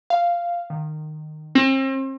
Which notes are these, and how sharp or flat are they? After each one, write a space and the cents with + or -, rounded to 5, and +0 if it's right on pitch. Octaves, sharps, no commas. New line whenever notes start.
F5 -5
D#3 -20
C4 +40